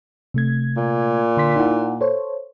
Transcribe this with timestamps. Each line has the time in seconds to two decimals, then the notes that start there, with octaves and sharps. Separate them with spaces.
0.34 C3 A3 G#6
0.77 A#2
1.37 D3 C6 B6
1.56 D#4 E4 F#5
2.01 A4 C5 C#5